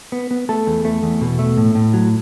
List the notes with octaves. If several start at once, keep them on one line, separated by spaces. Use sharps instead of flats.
B3
B3
A3 A4
E2
A3
E2
B2
A3
A2
A2
F#3